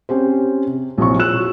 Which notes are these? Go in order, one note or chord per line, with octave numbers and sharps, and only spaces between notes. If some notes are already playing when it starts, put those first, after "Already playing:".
C4 C#4 G4 C5
C3
A#1 C3 F#3 E4 C#5 C#6
F4 E6 F#6 E7
F#4